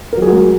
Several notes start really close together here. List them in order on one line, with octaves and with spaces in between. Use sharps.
A#4 F#3 G#4 F#4 G#3